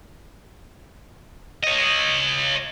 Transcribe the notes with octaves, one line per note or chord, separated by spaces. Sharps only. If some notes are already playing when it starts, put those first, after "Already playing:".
C#5 D#5